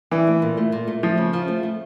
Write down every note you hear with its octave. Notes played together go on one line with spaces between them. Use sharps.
E3 D4
A3
A#2
A3
A#2
A3
F3 A3
C#3
F3
A3
A3